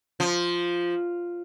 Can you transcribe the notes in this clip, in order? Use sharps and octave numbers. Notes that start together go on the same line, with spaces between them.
F3